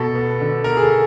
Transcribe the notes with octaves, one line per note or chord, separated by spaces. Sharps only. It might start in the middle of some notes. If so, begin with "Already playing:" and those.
Already playing: B2 A4
B3
D3
B3 A#4
G#4
A4